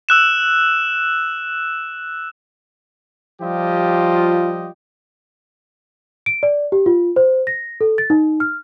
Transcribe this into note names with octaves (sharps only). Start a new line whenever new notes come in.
E6 F#6 E7
F3 G3 F4 G4 D#5
D7
D5
G4
F4
C5
A#6
A4
A6
D#4
F6